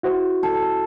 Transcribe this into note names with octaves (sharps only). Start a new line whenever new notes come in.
E4 F#4 C5
A4